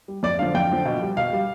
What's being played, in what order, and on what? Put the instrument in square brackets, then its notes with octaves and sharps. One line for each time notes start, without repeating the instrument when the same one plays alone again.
[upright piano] G3
F2 D5
D3 F3 F5
F2 G5
D3 F3
B2
G3
B2 F5
G3